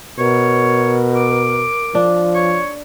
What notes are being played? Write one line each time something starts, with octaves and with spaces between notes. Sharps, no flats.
B2 A#4 C#5
D6
F3 D4
C#5